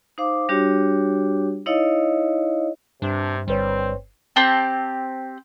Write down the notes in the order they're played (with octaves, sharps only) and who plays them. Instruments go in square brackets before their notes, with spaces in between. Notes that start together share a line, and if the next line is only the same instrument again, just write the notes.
[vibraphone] D#4 C5 F5 D6
G3 D4 F#4 G4 C#5
D#4 E4 C#5 D#5 F5
[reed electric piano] G2 [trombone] C3 [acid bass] D4
[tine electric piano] G1 B4 C#5 [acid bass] G3 [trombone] C4
[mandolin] C4 G4 A5